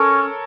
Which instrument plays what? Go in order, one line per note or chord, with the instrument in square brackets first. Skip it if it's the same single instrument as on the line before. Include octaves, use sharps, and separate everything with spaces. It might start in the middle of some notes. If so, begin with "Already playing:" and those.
Already playing: [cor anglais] C#4 [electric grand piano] A4 A#4 C#5